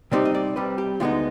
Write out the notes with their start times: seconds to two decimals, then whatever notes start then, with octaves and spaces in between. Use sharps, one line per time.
0.12 C3 G3 C4 D#4 D5
0.25 D#5
0.35 D5
0.56 C2 C3 G3 B4
0.78 G4
1.00 D2 D3 G#3 B3 D#4 F4